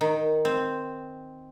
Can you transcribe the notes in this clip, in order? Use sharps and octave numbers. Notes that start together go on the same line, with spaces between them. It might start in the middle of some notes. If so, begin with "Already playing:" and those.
D#3
C4